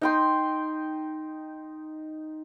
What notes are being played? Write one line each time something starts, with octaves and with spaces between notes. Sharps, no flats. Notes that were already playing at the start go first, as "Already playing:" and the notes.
D#4 G5 C6